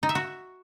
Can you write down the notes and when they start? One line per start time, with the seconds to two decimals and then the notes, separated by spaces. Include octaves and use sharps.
0.03 D#4
0.09 E5
0.15 F#4